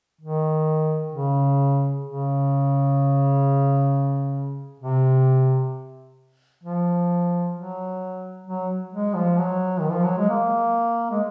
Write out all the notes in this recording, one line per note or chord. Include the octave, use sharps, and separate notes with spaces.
D#3
C#3
C#3
C3
F3
F#3
F#3
G#3
F3
F#3
D#3
F3
F#3
G#3
A#3
G#3